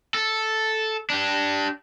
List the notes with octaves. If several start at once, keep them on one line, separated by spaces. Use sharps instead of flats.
A4
D4 G4